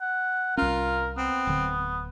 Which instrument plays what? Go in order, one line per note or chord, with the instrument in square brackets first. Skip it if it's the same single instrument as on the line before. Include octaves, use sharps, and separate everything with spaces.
[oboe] F#5
[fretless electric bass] C2 C#4 [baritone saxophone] F4 [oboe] A#4
[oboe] B3 [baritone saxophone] C4
[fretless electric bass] D1 D3